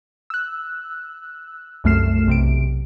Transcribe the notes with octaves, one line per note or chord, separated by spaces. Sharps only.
E6 F#6
C2 F#2 A3 F6 C7 E7
B1 C3 D7